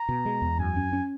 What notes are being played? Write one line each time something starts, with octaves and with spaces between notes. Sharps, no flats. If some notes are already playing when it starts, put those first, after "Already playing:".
Already playing: A#5
B2
G#3
E2
F#2 G#5
C#4
C#4